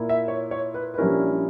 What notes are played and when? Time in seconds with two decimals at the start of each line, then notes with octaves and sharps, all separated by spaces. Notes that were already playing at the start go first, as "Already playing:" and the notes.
Already playing: A#2 A#3 E4
0.09 E5
0.28 C#5
0.51 C#5
0.74 B4
0.94 B4
0.98 A#1 A#2 G3 C#4 E4 A#4